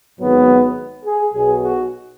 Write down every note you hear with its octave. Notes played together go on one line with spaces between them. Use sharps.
G#1 G#2 F#3 B3
G#4
B1 B2 F#3 G#4
F#4